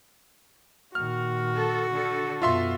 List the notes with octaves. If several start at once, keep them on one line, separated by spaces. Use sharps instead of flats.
A#2 D#3 F#4 F6
A4
D3 A4
F#2 B2 F4 E5 C6